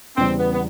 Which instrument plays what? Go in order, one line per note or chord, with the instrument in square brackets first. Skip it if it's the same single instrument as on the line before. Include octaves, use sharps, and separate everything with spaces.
[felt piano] E2 C#3 E3 G3 [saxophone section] C4
[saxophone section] B3
B3